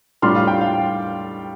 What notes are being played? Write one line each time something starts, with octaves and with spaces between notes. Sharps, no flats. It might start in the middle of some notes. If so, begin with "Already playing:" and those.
A2 G3 D4 F4 C6 F6
F5
G5
F5